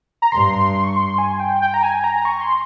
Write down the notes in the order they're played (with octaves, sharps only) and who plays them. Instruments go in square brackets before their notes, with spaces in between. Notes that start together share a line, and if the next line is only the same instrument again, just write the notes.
[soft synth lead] A#5
[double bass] G2 [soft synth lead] C6
[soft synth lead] C#6
C6
G#5
G5
G5
A#5
G#5
A#5
C#6
C6